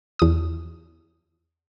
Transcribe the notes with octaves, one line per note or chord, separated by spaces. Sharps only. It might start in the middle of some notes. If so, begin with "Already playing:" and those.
E2 D#6